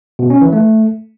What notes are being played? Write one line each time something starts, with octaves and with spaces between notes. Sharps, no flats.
B2
C#4
E3
A3